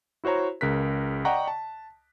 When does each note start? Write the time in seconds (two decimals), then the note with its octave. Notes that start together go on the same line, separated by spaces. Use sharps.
0.24 E4 F#4 C5 C#5 A#5
0.61 C#2 C#3 A#4 F#6 B6
1.25 D5 D#5 F#5 G5 A#5 C#6
1.48 A5